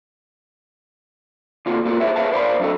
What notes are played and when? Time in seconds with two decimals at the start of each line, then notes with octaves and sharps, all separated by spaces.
1.66 D3 A#3 F4 F#4
1.85 A#3 F4 F#4 A#4
2.00 E4 G4 G#4 C5 C#5 E5
2.16 G#4 B4 C#5 E5 F5 A5
2.32 A#4 C5 D5 F5 B5
2.60 F#3 D4 F#4 A4 D#5